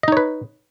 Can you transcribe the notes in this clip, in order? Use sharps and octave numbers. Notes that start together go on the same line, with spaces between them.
D#4 B4 C#5 D#5